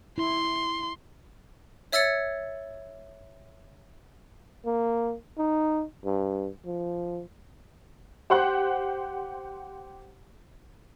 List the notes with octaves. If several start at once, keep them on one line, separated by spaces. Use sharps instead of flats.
E4 C6
C#5 E5 E6 G#6 A6 C#7
A#3
D#4
G2
F3
G4 C5 F#5 C6 F#6